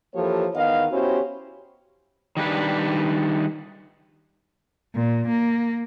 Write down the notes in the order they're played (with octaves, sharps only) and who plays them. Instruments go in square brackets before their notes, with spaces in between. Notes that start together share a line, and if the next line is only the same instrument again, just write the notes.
[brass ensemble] E3 F3 A#3 G4 A4 C#5
E2 D#3 B3 D#5 F5
B3 C#4 E4 F#4 G4 C5
[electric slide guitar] D#3 G3 D4 B4
[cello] A#2
A#3